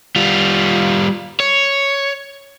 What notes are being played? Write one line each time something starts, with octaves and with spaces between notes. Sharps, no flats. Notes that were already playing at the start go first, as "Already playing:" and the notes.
G3 F4
C#5